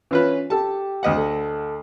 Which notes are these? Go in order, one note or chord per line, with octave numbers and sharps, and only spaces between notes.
E3 C#4 F4 B4
G4 A4 A5
D2 D#5 F#5
A4